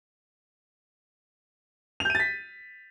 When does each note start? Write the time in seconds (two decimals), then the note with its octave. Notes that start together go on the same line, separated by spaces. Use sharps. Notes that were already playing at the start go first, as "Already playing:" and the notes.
2.00 F7
2.05 G6
2.10 D#7
2.15 A6
2.20 B6